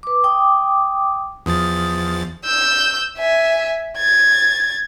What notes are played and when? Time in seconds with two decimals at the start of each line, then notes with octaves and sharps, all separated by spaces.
0.03 B4 D6
0.24 G5 D6 D#6
1.46 E2 F3 D#6 A6
2.45 E6 G6
3.17 E5 G#5
3.97 G#6 A6